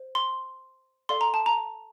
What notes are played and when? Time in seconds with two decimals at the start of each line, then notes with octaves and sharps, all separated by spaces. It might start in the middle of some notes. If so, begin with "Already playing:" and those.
Already playing: C5
0.15 C6
1.09 A4 D5 F5 C6
1.21 A#5
1.34 A5
1.46 A#5